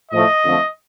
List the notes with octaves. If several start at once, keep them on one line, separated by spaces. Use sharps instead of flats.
A2 F3 A3 D#5
F2 D3 F3 A3